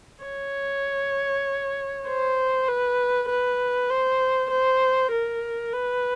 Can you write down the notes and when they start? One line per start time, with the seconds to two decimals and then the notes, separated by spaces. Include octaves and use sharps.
0.24 C#5
2.07 C5
2.68 B4
3.29 B4
3.90 C5
4.51 C5
5.12 A#4
5.73 B4